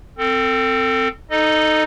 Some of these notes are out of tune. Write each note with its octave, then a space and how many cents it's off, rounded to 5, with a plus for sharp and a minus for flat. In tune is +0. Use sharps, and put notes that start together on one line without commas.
C4 -5 A4 +30
D#4 +0 A4 +0 D#5 -20